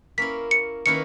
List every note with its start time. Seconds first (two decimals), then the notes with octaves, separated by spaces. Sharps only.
0.18 A#3 C#4 E4 B6
0.51 C#7
0.86 D#3 A#3 C#4 E4 B4 C#7